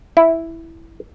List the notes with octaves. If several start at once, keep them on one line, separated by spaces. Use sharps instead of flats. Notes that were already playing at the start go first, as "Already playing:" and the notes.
E4